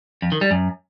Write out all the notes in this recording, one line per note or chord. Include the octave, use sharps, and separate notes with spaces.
F2
D#3
G3
F#2